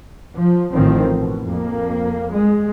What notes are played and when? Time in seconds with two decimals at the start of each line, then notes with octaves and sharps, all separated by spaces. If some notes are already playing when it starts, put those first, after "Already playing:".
0.37 F3
0.73 A1 D#3 F3 C4
1.18 B2
1.47 F2 A#3
2.33 G#3